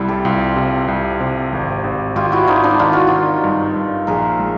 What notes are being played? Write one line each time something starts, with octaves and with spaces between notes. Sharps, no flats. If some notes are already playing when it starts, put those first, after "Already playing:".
Already playing: C2 C3 G3 E4
G4 A4
C2 F4 G4
C3
C2
C3
G#1
G#1
G#1 F4 G4
E4 F#4
G#1 D#4 F4
D4 E4
D#3 F4
F#4
D#3 D#4 F4
G2
G2
A#1 G#4 A#4
G#3